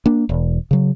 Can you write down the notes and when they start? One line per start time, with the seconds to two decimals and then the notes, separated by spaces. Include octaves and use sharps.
0.06 A#3 D4
0.29 E1
0.71 C#3 F#3